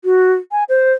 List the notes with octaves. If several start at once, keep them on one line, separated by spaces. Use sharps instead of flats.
F#4
G#5
C5